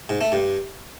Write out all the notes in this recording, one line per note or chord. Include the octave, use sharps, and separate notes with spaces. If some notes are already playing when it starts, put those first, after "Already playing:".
G#2
A3
G2